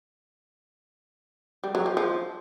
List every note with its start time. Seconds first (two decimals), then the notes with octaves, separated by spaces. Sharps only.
1.64 G3
1.75 F#3
1.86 F3
1.97 F3